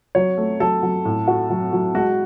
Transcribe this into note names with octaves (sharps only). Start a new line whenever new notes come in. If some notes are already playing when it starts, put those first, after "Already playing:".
F#3 C#5
A3
F#3 A4
F#3
A2
F#4
F#3
F#3
G#3 F#4